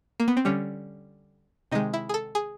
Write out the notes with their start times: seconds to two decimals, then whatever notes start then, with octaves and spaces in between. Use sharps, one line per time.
0.20 A#3
0.28 B3
0.37 C4
0.45 D3 G3 C#4
1.72 C3 D#3 G#3 D#4
1.94 E4
2.09 G#4
2.14 A4
2.35 G#4